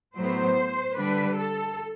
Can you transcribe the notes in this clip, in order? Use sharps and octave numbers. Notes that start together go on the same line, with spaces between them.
A2 F#3 B3 C5
D3 G3 D4 B4
A4